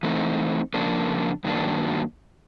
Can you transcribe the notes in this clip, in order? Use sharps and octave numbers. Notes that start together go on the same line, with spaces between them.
E3 A3 C4 D#4
F2 C#3 F3 A#3 D4
G2 D#3 F#3 A#3 D4